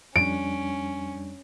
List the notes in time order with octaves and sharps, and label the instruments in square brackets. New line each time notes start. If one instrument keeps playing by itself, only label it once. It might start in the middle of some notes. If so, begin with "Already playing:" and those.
[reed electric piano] F2 G3 D4 [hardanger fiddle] C#4 [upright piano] D7